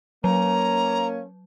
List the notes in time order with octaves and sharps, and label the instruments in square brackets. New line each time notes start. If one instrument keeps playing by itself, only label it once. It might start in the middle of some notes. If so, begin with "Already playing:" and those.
[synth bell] F#3 [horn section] A#3 [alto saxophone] C#4 [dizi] A#5